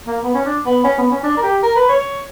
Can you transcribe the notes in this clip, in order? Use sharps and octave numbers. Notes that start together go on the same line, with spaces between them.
A#3
B3
C#4
D4
B3
C#4
B3
C#4
D4
A#4
G4
A#4
B4
C#5